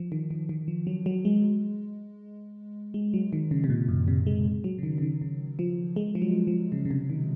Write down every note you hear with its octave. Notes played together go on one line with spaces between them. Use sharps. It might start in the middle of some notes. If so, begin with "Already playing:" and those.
Already playing: F3
D#3
D#3
D#3
F3
F#3
F#3
G#3
G#3
F#3
D#3
C#3
C3
A#2
F#2
C3
G#3
F#3
C#3
D#3
C#3
D#3
C#3
F3
G#3
F3
F#3
F3
C#3
C#3
C3
D#3